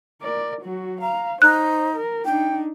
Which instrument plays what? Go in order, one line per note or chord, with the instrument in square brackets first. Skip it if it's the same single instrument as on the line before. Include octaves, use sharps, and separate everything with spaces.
[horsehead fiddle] A#4 D5
F#3 F#4
[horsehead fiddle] F5 [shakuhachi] A#5
[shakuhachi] D#4 [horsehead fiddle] C5 [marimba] F#6
[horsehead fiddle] A#4
[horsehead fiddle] D4 D#4 [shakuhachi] G5